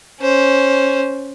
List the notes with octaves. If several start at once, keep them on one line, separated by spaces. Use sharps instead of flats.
C#4 C5